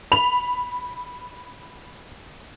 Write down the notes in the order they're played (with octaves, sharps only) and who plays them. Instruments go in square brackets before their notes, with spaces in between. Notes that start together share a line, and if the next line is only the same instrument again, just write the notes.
[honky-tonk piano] B5 F7